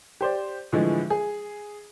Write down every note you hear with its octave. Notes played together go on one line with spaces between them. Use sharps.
G4 C5 D5
A2 D3 E3 F3 G#3
G#4